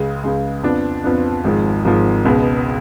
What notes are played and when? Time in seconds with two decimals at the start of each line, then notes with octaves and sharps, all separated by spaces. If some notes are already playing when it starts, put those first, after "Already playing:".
Already playing: C#2 C#3 G#3
0.23 C#2 C#3 G#3
0.63 F2 F3 B3 D4
1.04 F2 F3 B3 D4
1.44 G#1 G#2 F3 G#3
1.85 G#1 G#2 F3 G#3
2.25 C#2 B2 G#3 B3